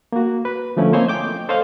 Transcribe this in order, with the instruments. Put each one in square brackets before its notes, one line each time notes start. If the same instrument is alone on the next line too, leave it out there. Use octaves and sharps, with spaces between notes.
[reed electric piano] A#3 F#4
B4
D3 F3 A3 C#4 E4
A#3 C4 C5 C#5 D#5 G#5
G5 D6 G6
A4 C5 C#5 D#5 F5